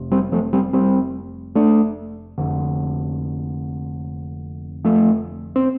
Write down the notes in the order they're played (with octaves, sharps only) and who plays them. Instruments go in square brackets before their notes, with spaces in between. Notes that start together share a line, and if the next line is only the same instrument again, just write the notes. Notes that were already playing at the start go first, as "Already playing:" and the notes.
Already playing: [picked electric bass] F1 C3
G3 C4
F3 A3
G3 C4
G3 C4
A3 D4
F1 F2 D3
F3 A3
C4